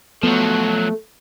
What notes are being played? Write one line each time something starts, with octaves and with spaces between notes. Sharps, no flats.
F3 F#3 A3 B3